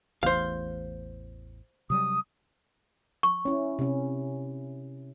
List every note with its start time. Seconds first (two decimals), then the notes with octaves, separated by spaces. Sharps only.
0.23 A1 E2 A2 C5 F5
1.90 C3 F#3 G3 D#6
3.23 C#6
3.45 C#4 E4
3.79 C3 C#4